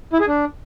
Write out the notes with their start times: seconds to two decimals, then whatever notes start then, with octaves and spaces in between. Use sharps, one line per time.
0.13 E4
0.20 G#4
0.27 D4